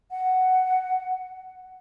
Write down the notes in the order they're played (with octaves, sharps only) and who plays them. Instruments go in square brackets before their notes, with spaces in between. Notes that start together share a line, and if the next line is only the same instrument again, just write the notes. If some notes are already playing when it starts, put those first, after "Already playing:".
[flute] F#5